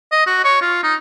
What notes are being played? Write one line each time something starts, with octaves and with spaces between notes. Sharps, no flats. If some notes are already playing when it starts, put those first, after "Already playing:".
D#5
F#4
C#5
F4
D#4